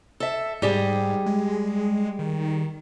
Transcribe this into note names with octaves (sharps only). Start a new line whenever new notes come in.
A4 E5
G#2 G3 G4 G#4
G#3
D#3